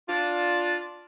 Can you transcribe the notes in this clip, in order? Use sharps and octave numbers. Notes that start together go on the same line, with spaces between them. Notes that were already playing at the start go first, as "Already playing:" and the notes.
D4 F4